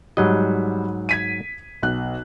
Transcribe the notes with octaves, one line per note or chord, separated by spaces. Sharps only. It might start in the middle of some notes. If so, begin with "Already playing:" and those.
G#2 F#3 G3 D#5
G#6 B6 D#7
B1 F#6